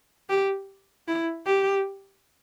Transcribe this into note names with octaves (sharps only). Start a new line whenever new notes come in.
G4
E4
G4